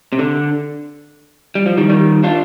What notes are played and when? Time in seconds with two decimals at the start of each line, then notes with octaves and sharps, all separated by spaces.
0.13 C3
0.19 D3
1.55 G3
1.66 F3
1.77 D#3 G3
1.89 D#3 G3
2.24 D4 F4